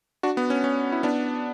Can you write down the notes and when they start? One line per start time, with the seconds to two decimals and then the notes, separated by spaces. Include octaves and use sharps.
0.23 D4 F#4
0.37 B3
0.50 C#4
0.64 C#4
0.92 E4
1.03 B3 D4